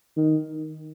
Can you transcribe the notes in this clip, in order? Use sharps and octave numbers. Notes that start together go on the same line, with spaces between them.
D#3